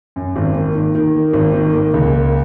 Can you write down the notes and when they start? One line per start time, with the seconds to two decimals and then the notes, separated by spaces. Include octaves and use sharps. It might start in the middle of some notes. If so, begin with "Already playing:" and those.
0.16 F#2
0.36 G#1
0.55 A#3
0.75 D#3
0.95 D#3
1.14 A#3
1.33 G#1
1.54 D#3
1.73 A#3
1.94 C#2
2.13 A#3